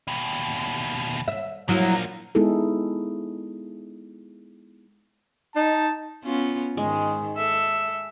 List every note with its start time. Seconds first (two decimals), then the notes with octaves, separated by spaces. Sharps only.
0.08 D#2 B2
1.28 E5
1.69 F3 F#3 A#3 E4
2.35 G#3 B3 D#4 E4 G#4 A4
5.56 D#4 A5
6.24 B3 C#4 F4
6.77 G#2 D#3 G#3
7.37 A4 E5